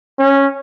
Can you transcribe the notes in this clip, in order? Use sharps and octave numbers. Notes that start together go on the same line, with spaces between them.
C#4